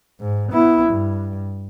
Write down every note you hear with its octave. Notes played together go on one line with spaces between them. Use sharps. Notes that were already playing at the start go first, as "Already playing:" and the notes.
G#2
B3 E4
G2